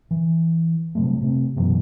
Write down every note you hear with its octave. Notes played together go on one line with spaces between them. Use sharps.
E3
C3 F#3 G3 A3
C3 A3 C4
F#2 B2 E3 F#3